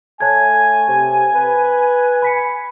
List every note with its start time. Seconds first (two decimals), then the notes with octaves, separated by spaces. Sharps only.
0.21 A3 C#5 G#5 A5 G#6
0.88 C3
1.35 B4
2.22 B5 B6 C#7